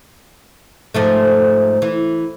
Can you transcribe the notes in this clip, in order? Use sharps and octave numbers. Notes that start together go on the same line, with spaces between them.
G#2 F3 A3
E3